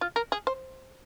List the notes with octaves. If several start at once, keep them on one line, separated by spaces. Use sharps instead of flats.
F4
A#4
G#4
C5